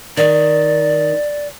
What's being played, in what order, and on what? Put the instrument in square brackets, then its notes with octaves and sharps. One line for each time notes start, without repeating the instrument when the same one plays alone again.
[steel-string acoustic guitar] D#3 [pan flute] D5